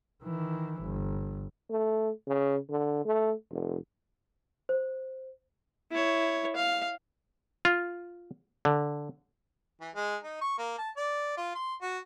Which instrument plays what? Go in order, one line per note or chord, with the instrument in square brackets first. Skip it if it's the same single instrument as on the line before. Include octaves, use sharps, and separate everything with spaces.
[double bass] D#3 E3
G1
[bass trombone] A3
C#3
D3
A3
F1
[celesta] C5
[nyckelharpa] E4 C#5
F5
[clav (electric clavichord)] F4
D3
[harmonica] E3
G#3
D#4
C#6
A#3
A5
D5
F4
C6
F#4